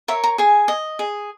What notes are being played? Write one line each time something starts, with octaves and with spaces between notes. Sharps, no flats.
A#4 C#5 E5
A#5
G#4 G#5
D#5
G#4